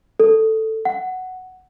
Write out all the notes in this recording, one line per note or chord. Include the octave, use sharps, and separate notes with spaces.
A4
F#5